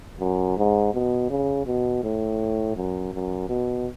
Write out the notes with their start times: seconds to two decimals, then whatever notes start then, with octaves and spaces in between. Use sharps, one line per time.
0.20 F#2
0.57 G#2
0.94 B2
1.30 C#3
1.66 B2
2.03 A2
2.76 F#2
3.13 F#2
3.49 B2